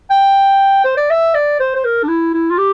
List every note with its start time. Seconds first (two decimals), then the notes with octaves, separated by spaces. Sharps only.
0.10 G5
0.85 C5
0.97 D5
1.10 E5
1.35 D5
1.60 C5
1.76 C5
1.85 A#4
2.04 D4
2.08 E4
2.34 E4
2.50 F4
2.58 G4